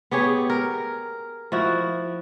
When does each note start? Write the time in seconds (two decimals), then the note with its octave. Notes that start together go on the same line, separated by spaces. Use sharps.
0.11 B3 G4 G#4 C#5
0.50 A#4
1.52 F3 E4 F#4